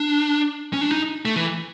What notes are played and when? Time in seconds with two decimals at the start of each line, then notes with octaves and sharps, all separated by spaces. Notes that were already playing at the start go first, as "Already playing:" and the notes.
Already playing: D4
0.73 C#4
0.81 D4
0.92 D#4
1.25 A3
1.36 E3